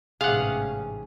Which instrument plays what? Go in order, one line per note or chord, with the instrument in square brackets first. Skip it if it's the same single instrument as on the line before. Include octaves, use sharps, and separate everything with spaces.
[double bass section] A1 G#2 C#4 [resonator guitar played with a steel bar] C3 G#4 [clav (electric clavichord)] F5 F#5